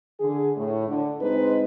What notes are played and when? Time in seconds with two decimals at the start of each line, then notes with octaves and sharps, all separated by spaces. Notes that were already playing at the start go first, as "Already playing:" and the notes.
0.20 D3 G#4
0.56 A2
0.88 D3
1.20 D2 G#3 C4 D#4 B4